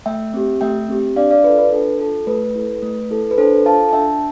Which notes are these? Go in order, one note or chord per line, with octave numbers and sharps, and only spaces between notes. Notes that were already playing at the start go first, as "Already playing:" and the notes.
A3 E5 G5
C4 G4
A3 E5 G5
C4 G4
D4 D5 F5
D5 F5
F4 A4 B4
B4
D4 A4
F4 A4
A3 B4
E4 A4
A3
E4 A4
B4
D4 A4 C5
F4 A4 F5 A5
A5
D4 E5 G5